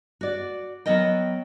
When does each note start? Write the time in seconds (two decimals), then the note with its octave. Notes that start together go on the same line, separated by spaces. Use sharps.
0.21 F#4 D5
0.86 F#3 B3 A#4 D#5 G5